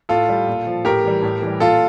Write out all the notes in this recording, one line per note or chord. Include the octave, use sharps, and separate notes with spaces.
A2 F4 A4
G3
A#2
F3
A2 G4 A#4
E3 G3
A2
E3 G3
A#2 F4 A4